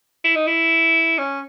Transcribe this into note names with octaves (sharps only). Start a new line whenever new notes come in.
E4
D#4
E4
C#4